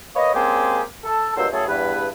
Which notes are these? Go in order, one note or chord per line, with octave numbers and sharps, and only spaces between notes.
A#3 B4 C#5 D#5
G#3 A#3 C4 C#4 G4 G#4
A4
G2 A#2 F#3 G#3 C5 E6
F#2 A2 C#3 A3 G#4 A4
E2 G2 B4